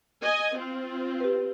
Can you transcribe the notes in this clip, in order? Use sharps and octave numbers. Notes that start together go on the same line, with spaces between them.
D#5 G#5
C4 F4
G4 B4